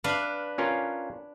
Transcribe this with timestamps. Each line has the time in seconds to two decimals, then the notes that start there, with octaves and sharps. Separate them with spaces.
0.04 D4 B4 F5
0.58 C#4 F4 A#4